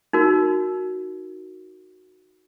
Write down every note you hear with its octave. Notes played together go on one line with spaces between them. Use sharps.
D#4 F#4 A#4